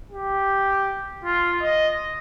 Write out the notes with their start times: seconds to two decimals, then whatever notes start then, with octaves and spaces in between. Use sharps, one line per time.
0.11 G4
1.24 F4
1.62 D#5